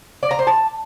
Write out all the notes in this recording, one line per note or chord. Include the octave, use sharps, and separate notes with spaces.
D5
A#5
C5
A5